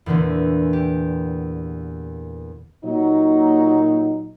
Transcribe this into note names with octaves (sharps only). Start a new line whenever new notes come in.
E2 A#2 D3 E3
G4
A#2 F#3 D#4